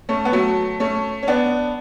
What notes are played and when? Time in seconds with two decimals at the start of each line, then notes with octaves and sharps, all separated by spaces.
0.09 A3 C#4
0.25 B3
0.32 F#3 A3
0.80 A3 C#4
1.23 C#4
1.27 B3 D4